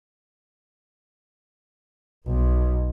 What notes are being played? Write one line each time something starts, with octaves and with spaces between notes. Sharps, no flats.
B1